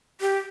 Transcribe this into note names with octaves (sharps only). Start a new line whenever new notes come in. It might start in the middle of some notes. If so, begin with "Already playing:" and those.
G4